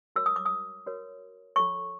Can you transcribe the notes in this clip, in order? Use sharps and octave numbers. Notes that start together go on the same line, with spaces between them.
F#4 A#4 C#5 E6
D#6
D6
D#6
F#4 A#4 C#5
F4 A4 C#5 C#6